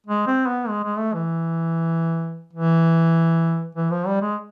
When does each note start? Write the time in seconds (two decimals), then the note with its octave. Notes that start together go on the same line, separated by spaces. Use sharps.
0.07 G#3
0.27 C4
0.48 B3
0.68 G#3
0.84 G#3
0.98 A3
1.14 E3
2.53 E3
3.75 E3
3.91 F3
4.07 G3
4.22 G#3